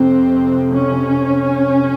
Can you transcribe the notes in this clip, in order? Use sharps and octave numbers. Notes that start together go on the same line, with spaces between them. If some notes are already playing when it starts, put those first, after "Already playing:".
Already playing: F2 C3 C4
C#4